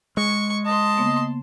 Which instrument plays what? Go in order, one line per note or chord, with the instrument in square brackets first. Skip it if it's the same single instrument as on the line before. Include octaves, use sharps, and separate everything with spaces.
[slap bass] G#3 [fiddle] C#6
[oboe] D#5 [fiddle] A5 C6
[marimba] C#3 A#3 B3